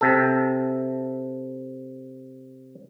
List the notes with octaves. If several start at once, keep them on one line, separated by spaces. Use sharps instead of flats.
C3 A4